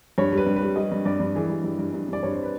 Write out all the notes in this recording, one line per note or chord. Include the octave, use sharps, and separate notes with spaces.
G2 C#5
G3 B4
G2
B4
G3
G3 D#5
G2
G2 D5
G2
E3 G#4
G2
G2
G2
G2
G2 D5
G2 C#5
C5
B4